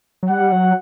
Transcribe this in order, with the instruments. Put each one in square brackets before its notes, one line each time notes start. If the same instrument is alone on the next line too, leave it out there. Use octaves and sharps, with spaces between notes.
[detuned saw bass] F#3
[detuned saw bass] G3 [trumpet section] F#5
[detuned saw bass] F#3